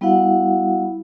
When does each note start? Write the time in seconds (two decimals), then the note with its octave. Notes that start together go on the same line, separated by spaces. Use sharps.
0.01 G3 B3 E4 F#4 F5 F#5